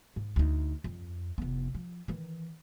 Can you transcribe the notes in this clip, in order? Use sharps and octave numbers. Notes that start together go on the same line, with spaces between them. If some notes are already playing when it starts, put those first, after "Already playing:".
G#2
D2 D#4
F2
F1 B3
F3
D#3 E3